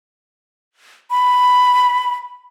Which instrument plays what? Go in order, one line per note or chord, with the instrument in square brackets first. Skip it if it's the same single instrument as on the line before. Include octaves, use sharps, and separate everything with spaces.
[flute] B5